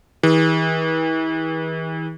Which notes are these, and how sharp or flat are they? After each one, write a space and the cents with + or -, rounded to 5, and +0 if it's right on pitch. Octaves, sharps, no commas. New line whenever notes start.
E3 -40 G#4 -40